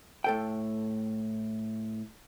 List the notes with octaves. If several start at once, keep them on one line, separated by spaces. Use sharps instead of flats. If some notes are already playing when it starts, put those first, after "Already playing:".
A2 A4 G5